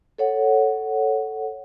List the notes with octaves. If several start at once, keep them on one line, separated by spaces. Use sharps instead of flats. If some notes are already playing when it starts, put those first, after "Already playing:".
A4 C#5 F#5